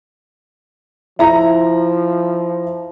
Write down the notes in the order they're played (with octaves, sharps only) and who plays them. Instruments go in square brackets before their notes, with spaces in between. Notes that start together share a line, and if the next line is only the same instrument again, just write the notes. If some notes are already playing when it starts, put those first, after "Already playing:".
[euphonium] F3 [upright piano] E4 A#5